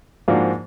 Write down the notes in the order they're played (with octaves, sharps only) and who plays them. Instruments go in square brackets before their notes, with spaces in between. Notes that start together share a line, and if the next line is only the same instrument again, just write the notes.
[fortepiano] G#2 F3 A#3 D4 F#4